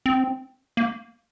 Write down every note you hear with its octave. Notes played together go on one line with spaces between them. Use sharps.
C4
A#3